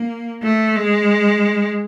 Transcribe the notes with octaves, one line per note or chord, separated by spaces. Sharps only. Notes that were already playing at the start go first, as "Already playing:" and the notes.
Already playing: A#3
A3
G#3